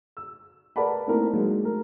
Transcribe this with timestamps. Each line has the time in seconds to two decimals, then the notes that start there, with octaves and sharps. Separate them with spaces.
0.17 E6
0.76 A#4 B4 D5 F#5 A5 B5
1.07 A3 A#3 C4 D#4 E4 A#4
1.33 F#3 G#3 A#3 D#4
1.63 A3 A#4